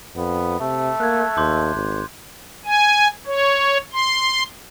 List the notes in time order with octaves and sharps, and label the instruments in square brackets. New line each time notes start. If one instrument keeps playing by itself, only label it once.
[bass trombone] F2 [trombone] B3
[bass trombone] C3 [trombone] A3
[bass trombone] A#3 [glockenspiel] F#6 G#6
[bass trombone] D#2 [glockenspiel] C6 D6 G6
[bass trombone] G#1
[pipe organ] G#5
C#5
C6